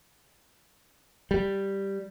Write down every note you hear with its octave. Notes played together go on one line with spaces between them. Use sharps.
G3